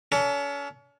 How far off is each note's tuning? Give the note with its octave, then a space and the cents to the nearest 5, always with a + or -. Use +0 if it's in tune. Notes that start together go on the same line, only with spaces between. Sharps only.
C#4 +40 A4 +30